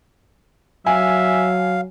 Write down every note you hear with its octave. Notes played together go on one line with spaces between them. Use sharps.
F#3 E5 F5 G#5